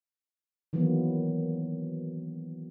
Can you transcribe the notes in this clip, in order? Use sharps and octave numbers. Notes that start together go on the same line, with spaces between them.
D#3 E3 F#3 A#3 B3